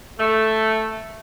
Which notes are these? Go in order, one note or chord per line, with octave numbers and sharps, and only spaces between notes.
A3